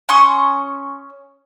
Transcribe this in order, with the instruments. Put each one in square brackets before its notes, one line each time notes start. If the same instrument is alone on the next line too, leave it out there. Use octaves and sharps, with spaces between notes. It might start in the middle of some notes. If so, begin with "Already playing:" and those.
[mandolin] C#4 C6 C#6 D#6